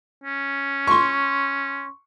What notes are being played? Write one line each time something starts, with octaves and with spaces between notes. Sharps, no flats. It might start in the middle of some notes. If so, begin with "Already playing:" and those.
C#4
C6 C#6